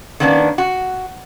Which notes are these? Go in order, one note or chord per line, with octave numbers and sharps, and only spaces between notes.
D#3 A#3 B3 C#4 D4
F#4